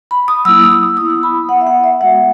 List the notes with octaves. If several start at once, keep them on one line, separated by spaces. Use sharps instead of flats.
B5
D#6
F#3 A#3 E4 E6
D#6
E6
B3 E4 D#6
D#6
B5
B3 E4 F#5
E5
F#5
E5
G#3 B3 F#4 F#5